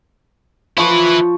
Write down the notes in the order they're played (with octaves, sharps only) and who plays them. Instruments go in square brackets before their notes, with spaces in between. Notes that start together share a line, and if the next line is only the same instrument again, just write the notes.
[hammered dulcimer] F3 C#6 [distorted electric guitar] E4 B4